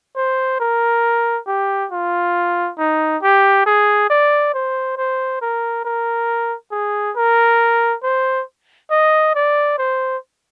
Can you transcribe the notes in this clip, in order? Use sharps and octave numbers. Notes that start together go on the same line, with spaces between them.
C5
A#4
G4
F4
D#4
G4
G#4
D5
C5
C5
A#4
A#4
G#4
A#4
C5
D#5
D5
C5